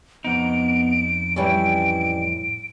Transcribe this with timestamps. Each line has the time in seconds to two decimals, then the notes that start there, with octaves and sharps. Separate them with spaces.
0.24 F2 B3 D#4 D7
1.36 A2 E3 G3 C#4